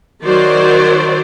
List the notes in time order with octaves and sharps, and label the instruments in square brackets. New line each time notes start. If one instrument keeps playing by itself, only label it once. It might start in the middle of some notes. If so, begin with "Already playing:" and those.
[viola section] D#3 F#3 C5 D5